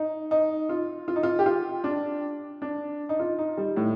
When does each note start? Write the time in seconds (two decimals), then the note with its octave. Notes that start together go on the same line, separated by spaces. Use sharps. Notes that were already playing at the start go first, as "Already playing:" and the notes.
Already playing: D#4
0.31 D#4
0.69 F4
1.08 F4
1.16 D#4
1.23 F4
1.39 G4
1.46 F4
1.84 D4
2.62 D4
3.09 D#4
3.20 F4
3.39 D#4
3.57 G3
3.77 A2